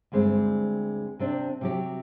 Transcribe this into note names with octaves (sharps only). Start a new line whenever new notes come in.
D2 G2 G#3 C4
C3 C4 D4
C3 F#3 G4